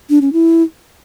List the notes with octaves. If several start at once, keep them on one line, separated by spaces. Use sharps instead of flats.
D4
C#4
E4